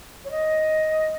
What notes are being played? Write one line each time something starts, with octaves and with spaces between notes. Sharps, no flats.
C#5
D#5